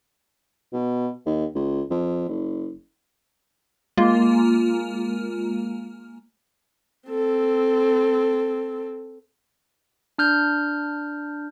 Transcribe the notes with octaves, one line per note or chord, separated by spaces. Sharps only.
B2
D#2
C#2
F2
F#1
G#3 A#3 F4
C4 A4
D4 F6 G6